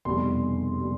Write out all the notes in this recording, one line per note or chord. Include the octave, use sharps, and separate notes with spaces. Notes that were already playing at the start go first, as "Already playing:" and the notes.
F1 E2 B2 G3 C6
B2 G3